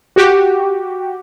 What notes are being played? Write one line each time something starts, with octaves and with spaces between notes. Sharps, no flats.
F#4 G4